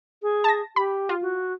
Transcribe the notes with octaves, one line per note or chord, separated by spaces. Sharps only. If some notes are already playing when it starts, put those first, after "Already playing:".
G#4
A5 A#6
G4 B5
F4
F#4